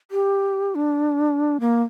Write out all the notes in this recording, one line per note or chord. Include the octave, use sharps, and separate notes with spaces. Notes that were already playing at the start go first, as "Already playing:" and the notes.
G4
D4
A#3